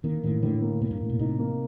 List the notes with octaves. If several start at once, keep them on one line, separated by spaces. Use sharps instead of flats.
D#3 A#3
A2 D#3
A2 D3
A#3
C3 A#3
G2
A2
B2
C3 D#4
A#3